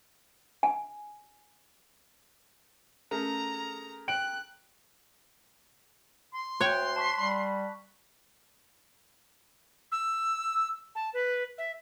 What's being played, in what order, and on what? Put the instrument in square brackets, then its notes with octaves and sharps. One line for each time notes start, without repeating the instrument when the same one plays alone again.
[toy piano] G#5
[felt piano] A3 G#4 A#4 [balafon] C#4 [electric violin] A#5
[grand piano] G5 D7 F#7 [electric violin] F#6
[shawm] C6
[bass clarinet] D2 [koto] C#5 G5 [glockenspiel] F#6
[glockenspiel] A5 C#6 B6
[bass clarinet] G3 [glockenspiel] B5
[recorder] E6
A5
B4
E5